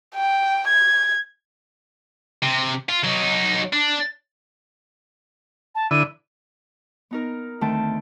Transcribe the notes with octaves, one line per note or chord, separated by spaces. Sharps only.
G5
G#6
C3
F4
F#3 D#4
D4
A5
D3 E4 D#7
B3 D#4 A#4
D2 D#3 A3 C4 G5 A5